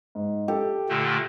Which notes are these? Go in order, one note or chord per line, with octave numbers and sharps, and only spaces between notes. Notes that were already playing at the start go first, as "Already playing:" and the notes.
G#2
G4 A4
A#2 D3 A3